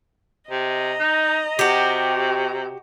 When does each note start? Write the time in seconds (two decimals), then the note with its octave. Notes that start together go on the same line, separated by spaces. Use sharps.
0.51 C3 D#5 A#5
1.00 D#4
1.59 C3 F#4 G4